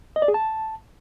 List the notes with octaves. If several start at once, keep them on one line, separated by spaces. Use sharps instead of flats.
D#5
D5
G#4
A5